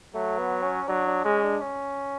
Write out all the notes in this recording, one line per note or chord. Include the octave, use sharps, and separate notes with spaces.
F#3 A3
B3
C#4
F#3 D4
D4
G#3 C#4
D4
C#4